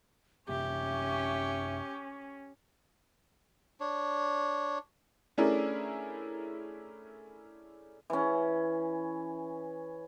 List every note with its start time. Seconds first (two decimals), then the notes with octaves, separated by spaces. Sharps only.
0.49 F#2 C3 A#3 C#4 G4 E5
3.80 D4 C#5
5.38 A3 C#4 D4 E4 G#4 A#4
8.10 E3 C#4